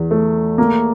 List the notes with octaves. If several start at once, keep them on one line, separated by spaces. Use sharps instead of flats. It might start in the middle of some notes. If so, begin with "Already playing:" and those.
Already playing: E2
A3
A#3